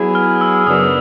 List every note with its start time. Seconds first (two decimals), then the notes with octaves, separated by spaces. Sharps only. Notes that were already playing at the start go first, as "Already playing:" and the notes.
Already playing: F#3 B3 E4 G#4
0.15 F6
0.41 E6
0.67 F#2 C#3 F#3 B3 D4 D#6